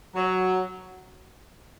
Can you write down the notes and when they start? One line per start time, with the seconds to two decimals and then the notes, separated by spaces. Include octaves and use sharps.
0.15 F#3